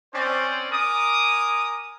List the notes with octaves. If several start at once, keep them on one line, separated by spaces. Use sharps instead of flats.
C4 C#4 C5 D5
A#4 G#5 D6 D#6